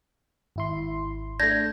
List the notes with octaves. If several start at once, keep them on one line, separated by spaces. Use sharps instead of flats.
G#1 E4 C6
A3 D4 G6 G#6 A#6